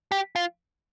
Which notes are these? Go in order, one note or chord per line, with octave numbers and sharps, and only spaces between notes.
G4
F4